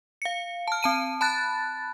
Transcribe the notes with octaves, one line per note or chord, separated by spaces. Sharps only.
F5 C#7
A5 F6
C4 A5 D#7
A5 B5 F#6 A6